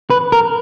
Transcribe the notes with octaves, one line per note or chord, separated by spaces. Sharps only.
B4
A#4